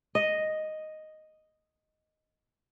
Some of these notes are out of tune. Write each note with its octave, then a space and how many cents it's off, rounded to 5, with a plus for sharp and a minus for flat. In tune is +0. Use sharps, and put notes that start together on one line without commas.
D#5 +0